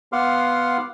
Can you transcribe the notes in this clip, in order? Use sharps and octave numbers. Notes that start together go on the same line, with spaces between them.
B3 F5 F#5 C6 D6 F6